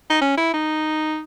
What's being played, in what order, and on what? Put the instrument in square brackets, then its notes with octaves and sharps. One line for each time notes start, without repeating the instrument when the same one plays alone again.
[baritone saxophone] D#4
C#4
E4
D#4